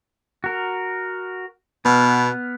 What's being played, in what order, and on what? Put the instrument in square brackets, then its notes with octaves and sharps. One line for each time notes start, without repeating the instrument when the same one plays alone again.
[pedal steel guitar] F#4 A#4
[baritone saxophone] B2 [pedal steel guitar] B3 F6